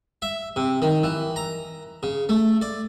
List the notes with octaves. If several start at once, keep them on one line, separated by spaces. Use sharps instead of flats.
E5
C3
D#3
E3
A#5
C#3
A3
D5